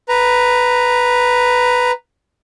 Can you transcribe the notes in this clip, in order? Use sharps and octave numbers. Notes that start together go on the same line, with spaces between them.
B4 A#5